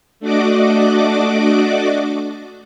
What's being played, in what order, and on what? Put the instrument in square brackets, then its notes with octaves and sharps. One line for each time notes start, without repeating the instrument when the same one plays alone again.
[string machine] A3 D4 F#4 D5 D#5 D6